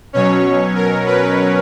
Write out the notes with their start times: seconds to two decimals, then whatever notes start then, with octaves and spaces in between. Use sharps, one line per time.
0.13 B2 F#3 C#4 C#5
0.76 A#4
1.06 B4